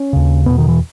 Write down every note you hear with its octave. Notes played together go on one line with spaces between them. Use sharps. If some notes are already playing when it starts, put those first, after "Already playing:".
Already playing: C#4
D#2 C#3
E2 B2 B3
D#3
E3